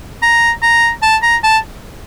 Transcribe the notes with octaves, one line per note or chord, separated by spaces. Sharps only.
A#5
A#5
A5
A#5
A5